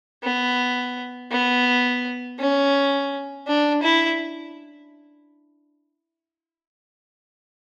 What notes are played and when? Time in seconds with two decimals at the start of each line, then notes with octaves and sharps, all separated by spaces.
0.23 B3
1.31 B3
2.39 C#4
3.47 D4
3.83 E4